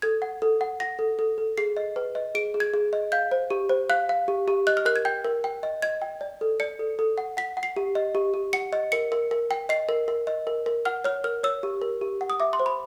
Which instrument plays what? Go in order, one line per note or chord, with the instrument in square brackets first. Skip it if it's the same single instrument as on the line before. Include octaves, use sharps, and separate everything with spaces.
[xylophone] A4 G#6
F#5
A4
F#5
F#5 A#6
A4
A4
A4
G#4 C7
D#5
B4
D#5
G#4 D7
G#4
G#6
G#4
D#5
F5 G6
C5
G4
C5
F5 F#6
F5
G4
G4
D#5 F#6
F6
A#4 F#6
G#6
G5 G6
A#4
G5
D#5
D#5 G#6
G5
D5
A4
D5 C#7
A4
A4
F#5
F#5 B6
F#5
C7
G4
D#5
G4
G4
F#5 C#7
D#5
A#4 C#7
A#4
A#4
G5
D#5 C7
A#4
A#4
D#5
A#4
A#4
F#5 F6
C#5 F6
A#4 F6
C#5 E6
G4
A#4
G4
F#5
D#6
E5 D6
C6
C5
B5